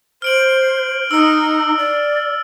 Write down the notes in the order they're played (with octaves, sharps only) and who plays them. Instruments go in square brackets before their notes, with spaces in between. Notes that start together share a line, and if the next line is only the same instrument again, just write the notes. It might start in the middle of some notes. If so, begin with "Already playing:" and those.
[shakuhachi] C5 [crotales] F6 D7 F#7
[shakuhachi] D#4 [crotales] E6 F6
[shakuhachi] D5